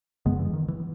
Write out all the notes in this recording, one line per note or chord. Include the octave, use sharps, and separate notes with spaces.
F#2 C#3 G#3 B3
E3
D#3
E3